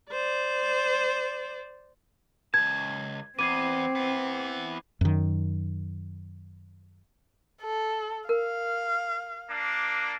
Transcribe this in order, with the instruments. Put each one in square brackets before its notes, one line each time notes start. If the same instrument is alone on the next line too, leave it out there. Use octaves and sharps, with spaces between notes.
[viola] C5 D5
[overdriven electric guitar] C#2 A5 [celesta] G#6
[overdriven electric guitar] E2 B3 [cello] C4 [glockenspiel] D6 G#6 C7 [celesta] D#7
[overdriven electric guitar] E3 B3
[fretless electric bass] F#2 D#3
[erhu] A4
[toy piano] A#4 [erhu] F5
[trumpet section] A#3 D4